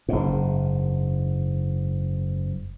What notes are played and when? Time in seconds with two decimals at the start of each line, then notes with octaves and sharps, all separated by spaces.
0.09 F#1 G#2